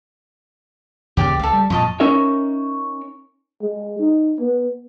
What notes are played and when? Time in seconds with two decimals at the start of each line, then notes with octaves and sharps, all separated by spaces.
1.17 D#2 C#3 G4 D5
1.39 C#2 A4 F5
1.53 G3
1.70 F2 A#2 C#5 D#5 A5
2.00 C#4 D#4 A#4 C#5 E5
3.62 G#3
3.99 D#4
4.39 B3